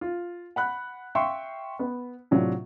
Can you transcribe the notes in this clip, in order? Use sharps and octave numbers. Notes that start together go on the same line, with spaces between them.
F4
F#5 B5 F#6
E5 F5 G5 C6 C#6
B3
A2 C3 F#3 D4 F4